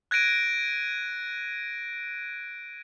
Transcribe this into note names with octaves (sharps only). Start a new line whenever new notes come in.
F#6 G#6 A#6 D7 D#7